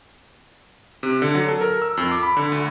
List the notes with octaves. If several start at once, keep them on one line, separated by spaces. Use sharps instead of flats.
C3
D3
F#3
A4
A#4
E6
F2
D6
B5
D3
D2